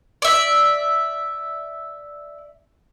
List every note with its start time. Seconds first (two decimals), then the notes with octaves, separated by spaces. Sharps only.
0.22 D5 E5